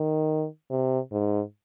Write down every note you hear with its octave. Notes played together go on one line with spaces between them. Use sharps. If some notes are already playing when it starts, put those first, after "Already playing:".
Already playing: D#3
C3
G#2